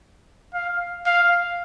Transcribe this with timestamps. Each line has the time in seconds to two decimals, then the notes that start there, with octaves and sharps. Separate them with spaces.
0.54 F5
1.06 F5